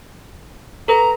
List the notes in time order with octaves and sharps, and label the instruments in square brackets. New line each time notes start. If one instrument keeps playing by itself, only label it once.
[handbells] A4 B4 [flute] A#5